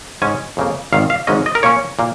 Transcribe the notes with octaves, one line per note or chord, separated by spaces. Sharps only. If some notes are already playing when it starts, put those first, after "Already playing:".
G#2 G#3 C#4 G#5
F2 C#3 A#3
G#1 G#2 D#3 F5
F5
G#1 G#2 G#3 C#4 D#5
D#5
A#4
A#2 A#3 C#4 C#5
A#2 A#3